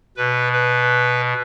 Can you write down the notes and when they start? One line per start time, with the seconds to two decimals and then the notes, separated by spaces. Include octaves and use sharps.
0.17 B2 B4
0.53 B4